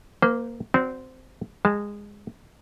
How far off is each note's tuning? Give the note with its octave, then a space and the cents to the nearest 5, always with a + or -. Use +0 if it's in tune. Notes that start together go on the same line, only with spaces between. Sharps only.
A#3 +0 C5 -40
C4 -15 F#4 +0 D5 -40
G#3 -20 A5 +5